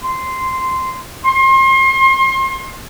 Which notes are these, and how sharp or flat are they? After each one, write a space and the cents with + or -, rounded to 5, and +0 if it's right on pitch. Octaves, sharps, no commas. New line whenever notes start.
C6 -10
C6 +35